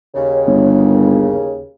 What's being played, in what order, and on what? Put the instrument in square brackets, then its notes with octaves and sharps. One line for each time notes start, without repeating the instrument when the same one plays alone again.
[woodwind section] D#2 C#3
[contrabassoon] G1